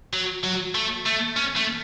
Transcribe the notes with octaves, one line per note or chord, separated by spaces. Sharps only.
F#3
F#3
A3
A3
C#4
A3